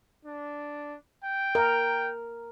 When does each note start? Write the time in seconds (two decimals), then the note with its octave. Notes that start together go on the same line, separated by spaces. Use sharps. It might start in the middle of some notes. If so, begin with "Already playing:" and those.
0.25 D4
1.23 G5
1.55 A#4